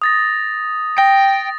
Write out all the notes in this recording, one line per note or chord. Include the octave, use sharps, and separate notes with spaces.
D#6 A6 A#6
G5 A#6